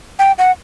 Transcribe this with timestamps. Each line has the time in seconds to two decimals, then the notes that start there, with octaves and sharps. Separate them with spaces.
0.19 G5
0.38 F#5